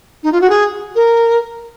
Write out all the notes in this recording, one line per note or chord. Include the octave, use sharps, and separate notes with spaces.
D#4
F4
F#4
G#4
A#4